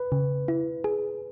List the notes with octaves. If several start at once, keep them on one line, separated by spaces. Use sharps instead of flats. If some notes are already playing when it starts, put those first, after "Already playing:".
Already playing: B4
C#3
E4
G#4